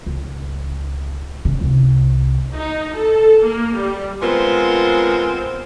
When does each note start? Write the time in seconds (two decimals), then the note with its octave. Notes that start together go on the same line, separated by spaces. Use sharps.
0.06 C#2
1.45 C#3
1.61 C2
2.55 D#4
2.94 A4
3.43 A#3
3.76 G3
4.22 G#3 B3 C4 F4 A#4